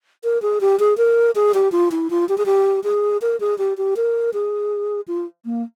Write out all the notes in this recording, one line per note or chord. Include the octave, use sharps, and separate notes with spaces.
A#4
G#4
G4
G#4
A#4
G#4
G4
F4
E4
F4
G4
G#4
G4
G#4
A#4
G#4
G4
G4
A#4
G#4
F4
A#3